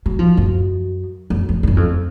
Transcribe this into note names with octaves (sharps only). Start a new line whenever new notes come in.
F#3
F3
F#2
F#2
F2
F2
F#2
F2